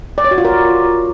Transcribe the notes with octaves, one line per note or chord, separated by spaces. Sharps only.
D5
C#5
F#4
F4
A#4